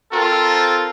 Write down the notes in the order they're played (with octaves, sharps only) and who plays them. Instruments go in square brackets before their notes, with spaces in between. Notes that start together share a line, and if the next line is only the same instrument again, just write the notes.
[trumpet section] C4 F4 A4 A#4